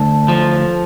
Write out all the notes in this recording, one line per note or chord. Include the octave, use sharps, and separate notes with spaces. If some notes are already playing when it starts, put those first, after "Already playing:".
Already playing: D2 A4
F3